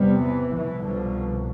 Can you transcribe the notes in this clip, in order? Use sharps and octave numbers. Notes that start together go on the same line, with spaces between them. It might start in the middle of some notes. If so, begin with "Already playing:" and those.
Already playing: E2 C3 G3 B3
E3
C2 B2 E3
D3 F3